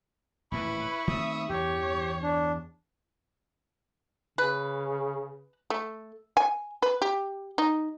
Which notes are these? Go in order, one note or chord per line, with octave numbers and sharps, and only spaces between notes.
D#1 A2 E3 E4 B4 B5 C#6
D#3 A3 C4 E5 D#6
E2 G2 E3 G4 C#5
D4
C#3 B4
A3
G#5
B4
G4
D#4